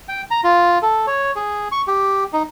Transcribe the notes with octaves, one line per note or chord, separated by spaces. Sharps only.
G5
A#5
F4
A4
C#5
G#4
C#6
G4
D#4